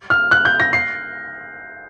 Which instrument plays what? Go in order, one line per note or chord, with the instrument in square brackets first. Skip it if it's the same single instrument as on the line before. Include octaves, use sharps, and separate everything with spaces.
[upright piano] F6
F#6
G6
A#6
C7